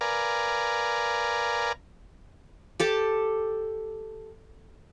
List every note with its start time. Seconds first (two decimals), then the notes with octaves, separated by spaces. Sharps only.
0.01 A#4 B4 D5 F5 G#5 A#5
2.80 G4 A4 A5